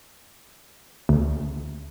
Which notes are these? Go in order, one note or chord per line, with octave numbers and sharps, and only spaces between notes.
D2